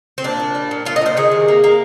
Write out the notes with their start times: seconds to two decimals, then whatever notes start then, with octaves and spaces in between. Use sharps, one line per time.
0.18 C4
0.24 A#2 D4
0.40 A#2
0.55 G3
0.71 A#2
0.85 A#2 F4
0.96 D#5
1.01 A#2 C5
1.17 D#3 G#4
1.32 C3
1.48 A#3
1.64 A#3